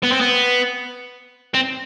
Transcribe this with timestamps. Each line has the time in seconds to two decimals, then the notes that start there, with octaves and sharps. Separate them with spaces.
0.04 B3
0.12 C4
0.21 B3
1.54 C4